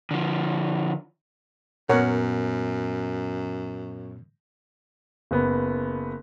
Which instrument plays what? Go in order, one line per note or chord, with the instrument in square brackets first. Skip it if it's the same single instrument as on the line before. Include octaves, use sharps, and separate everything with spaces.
[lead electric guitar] D3 F3
[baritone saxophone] F#2 [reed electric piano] A#2 B3 [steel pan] A#4 C#5 F#5
[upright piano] F#1 B3